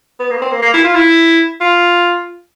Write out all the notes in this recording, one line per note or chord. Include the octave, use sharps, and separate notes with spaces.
B3
A#3
B3
C4
A#3
A#3
E4
F4
E4
F4